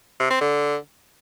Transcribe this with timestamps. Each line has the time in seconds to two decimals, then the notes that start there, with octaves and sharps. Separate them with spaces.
0.20 C3
0.30 C4
0.41 D3